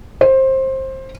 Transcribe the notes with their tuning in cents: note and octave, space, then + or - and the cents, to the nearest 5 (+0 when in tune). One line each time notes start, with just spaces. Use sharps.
C5 +20